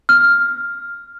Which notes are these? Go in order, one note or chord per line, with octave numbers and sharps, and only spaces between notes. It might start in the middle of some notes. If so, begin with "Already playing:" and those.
F6